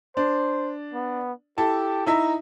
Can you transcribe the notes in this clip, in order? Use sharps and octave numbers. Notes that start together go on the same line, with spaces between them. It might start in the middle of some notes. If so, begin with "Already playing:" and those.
D4 C5
B3
E4 G4 A4 A5
D#4 E4 E5 A#5